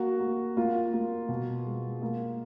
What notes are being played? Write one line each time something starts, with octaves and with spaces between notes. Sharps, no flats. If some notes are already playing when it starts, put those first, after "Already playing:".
Already playing: A#3 F#4
A#3
A#3 F4
A#3
B2
G#3
A#3